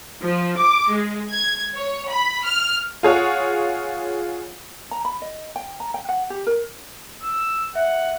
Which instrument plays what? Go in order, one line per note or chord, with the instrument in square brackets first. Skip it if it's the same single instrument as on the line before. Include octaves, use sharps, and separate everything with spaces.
[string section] F3
D6
G#3
G#6
C#5
B5
F6
[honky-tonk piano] F4 G#4 C#5 F#5
[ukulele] A#5
B5
D#5
G5
A#5
G5
F#5
G4
A#4
[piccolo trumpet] E6
[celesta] E5 [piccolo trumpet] F#5